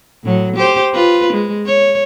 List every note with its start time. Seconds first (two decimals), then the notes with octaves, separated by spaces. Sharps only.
0.24 A2 F#3
0.57 G4 C5
0.94 F4 B4
1.33 G#3
1.66 C#5